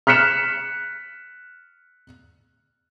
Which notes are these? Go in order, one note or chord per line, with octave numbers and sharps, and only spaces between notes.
F6 F#6 B6 C#7 E7